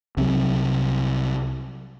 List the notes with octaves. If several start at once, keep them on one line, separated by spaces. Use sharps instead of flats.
C2 C3 D#3 F#3